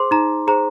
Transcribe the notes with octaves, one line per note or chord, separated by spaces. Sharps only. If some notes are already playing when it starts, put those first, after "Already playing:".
Already playing: G#4 C5 C6 D6
D#4 A#5
G#4 C5 A#5